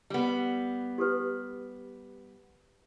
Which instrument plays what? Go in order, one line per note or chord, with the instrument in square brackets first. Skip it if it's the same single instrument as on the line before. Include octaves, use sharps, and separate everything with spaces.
[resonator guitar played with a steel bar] G3 B3
[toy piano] G4 A4 B4